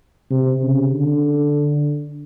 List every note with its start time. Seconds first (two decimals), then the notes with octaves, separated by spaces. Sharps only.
0.30 C3
0.62 C#3
0.93 D3